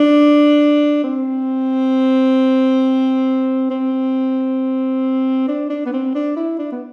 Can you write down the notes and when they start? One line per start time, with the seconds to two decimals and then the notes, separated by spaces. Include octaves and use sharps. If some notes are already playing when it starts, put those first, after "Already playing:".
Already playing: D4
1.04 C4
3.70 C4
5.48 D4
5.70 D4
5.85 B3
5.93 C4
6.15 D4
6.36 E4
6.59 D4
6.72 B3